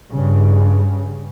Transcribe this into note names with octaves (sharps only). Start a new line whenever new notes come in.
G2 C#3